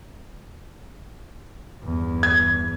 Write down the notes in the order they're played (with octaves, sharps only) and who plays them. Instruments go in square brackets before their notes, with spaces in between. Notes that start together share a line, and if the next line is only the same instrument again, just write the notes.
[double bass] E2 G2
[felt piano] G#6